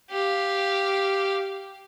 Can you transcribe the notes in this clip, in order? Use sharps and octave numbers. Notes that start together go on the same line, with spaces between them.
G4 F5